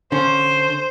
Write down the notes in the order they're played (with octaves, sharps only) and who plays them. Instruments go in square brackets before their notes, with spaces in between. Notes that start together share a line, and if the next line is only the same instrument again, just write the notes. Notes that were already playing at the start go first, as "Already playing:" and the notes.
[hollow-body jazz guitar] D3 C#4 [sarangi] C5